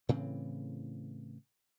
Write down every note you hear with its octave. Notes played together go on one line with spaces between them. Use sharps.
A2 C#3 E3 C4